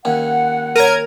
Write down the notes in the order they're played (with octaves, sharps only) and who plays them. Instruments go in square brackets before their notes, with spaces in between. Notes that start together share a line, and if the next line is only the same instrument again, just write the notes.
[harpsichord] D#2 C#4 [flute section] F#5
[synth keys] A#4 A#5 G#6 [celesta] C#5 D#7